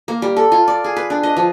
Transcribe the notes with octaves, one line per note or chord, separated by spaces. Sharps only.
A#3
G3
A4
F4
D5
G#4
B4
D4
D#5
F3